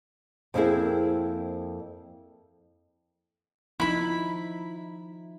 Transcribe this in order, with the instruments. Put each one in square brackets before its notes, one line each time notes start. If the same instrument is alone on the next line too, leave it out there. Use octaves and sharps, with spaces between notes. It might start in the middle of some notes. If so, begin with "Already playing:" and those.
[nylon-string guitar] F2 A#3 C4 D4 E4 G#4
[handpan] F3 D#4 [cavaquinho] E4 B5